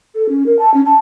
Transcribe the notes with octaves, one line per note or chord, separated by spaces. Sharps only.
A4
C#4
A#4
A5
C#4
A5